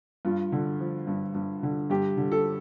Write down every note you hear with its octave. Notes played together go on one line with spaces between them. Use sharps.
G2 F4
D3
F3
G2
G2
D3
G2 G4
D3
A4